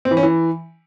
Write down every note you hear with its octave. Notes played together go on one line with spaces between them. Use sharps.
C4
E3
C#4
E3